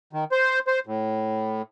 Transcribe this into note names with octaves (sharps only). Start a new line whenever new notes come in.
D#3
C5
C5
A2